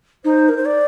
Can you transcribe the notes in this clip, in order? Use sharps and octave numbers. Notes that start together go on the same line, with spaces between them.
D#4 C5
A#4
C5
D5